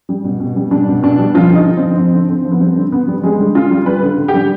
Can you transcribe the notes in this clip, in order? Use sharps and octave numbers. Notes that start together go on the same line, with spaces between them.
G3
B2
B2
G3
G3 D4
B2
B2 D4
G3
F3 F4
D3
D#4
D3
F3 C4
F3 C4
D3
D3 C4
F3
B3
G3 C4
D3
D3 B3
G3
G3 G#3
D3
D3 F4
G3
G3 B4
D3
D3
G4
G3